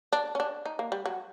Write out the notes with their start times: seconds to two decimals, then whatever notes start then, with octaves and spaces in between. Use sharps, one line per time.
0.13 D4
0.35 C#4
0.40 D4
0.65 D#4
0.79 A#3
0.92 G3
1.06 F#3